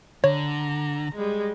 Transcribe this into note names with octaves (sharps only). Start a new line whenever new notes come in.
D3 C#5 A#5
G3 G#3